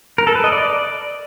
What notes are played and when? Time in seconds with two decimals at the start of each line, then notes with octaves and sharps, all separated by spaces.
0.18 A#4
0.27 A4
0.35 B4
0.44 D#5
0.52 D5